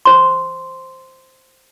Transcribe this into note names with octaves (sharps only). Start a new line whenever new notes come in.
C5 C6